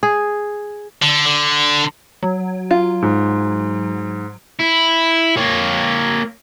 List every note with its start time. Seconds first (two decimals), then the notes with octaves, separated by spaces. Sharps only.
0.03 G#4
1.02 D3
1.26 D3
2.23 F#3
2.71 F4
3.02 G#2
4.60 E4
5.37 A#3 C#5